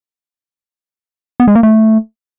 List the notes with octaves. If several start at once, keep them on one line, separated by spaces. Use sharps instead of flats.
B3
G#3
A#3
A3